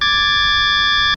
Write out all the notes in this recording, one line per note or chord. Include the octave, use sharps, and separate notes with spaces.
D6 G#6 A6